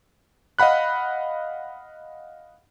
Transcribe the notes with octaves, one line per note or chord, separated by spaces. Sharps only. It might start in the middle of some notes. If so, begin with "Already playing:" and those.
D#5 F5 F#5 B5 F#6